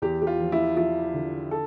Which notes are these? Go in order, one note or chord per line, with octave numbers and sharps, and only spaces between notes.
E2 G4
G4
F4
F3
E4
F3 E4
D3
A4